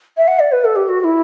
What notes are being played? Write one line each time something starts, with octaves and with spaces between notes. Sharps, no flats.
E5
F#5
D5
B4
A4
G4
F#4
F#4
E4